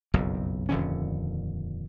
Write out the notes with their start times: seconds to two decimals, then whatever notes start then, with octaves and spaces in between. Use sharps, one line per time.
0.14 F#1 B1 F2
0.69 D#1 F2 D3 C#4